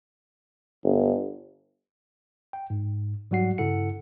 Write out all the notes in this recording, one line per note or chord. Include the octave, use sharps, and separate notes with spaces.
G1
G5
G#2
G#2 F#3 G3 F#4 F#5 C7
G2 C#3 E4 A4 F#5 C#7